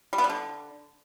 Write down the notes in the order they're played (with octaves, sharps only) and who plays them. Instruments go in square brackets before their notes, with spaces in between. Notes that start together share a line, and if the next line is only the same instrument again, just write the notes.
[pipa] G3
B3
G3
D3